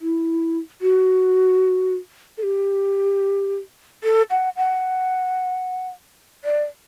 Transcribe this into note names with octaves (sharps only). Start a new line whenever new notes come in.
E4
F#4
A4
G4
A4
F#5
F#5
D5